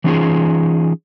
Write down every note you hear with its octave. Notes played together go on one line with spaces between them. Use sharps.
E3 F#3 C#4 D#4 F4 G#4